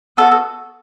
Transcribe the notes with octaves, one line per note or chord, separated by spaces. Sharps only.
B3 D4 F#4 A4
A4